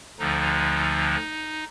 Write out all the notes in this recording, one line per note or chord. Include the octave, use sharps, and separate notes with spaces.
D2 D3 F3 D#4